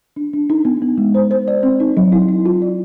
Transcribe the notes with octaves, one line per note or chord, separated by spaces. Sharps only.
D4
D4
D#4
B3
B3
G#3
C5
C5
D5
C4
D#4
F#3
E4
E4
F4
D5